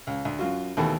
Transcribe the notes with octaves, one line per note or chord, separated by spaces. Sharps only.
C#2
D2
F#2 F4 F#4
D#2 B2 D#3 E3 A3